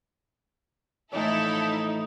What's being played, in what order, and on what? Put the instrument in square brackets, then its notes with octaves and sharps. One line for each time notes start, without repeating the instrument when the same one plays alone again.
[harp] A2 E3 F3 [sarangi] D#4 [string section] E4 A4